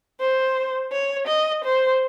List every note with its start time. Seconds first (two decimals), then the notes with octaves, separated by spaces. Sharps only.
0.20 C5
0.92 C#5
1.27 D#5
1.64 C5